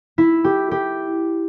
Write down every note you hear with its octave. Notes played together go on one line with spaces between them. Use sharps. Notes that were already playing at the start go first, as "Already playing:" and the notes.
E4
G4
G4